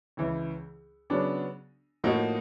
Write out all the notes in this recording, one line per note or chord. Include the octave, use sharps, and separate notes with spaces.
C#2 C#3 E3
C#3 F#3 B3 D4
A2 F3 A#3 D#4 F#4